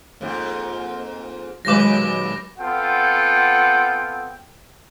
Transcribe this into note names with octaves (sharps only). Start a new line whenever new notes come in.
F2 G#2 A#3
D#2 A#2 F#3 G#3 B4 D6 A#6
B3 C4 F4 A4 F#5 G5